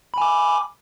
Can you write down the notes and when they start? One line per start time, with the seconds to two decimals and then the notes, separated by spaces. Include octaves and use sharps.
0.14 B5
0.18 G#5
0.22 D6